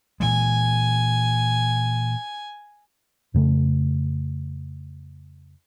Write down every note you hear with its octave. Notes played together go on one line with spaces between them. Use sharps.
A#2 E3 G#3 G#5
F2 C#3 A3